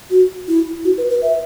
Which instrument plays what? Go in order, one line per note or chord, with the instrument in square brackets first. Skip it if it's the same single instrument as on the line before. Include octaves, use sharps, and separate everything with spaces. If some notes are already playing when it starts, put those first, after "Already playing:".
[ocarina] F#4
E4
F#4
B4
B4
E5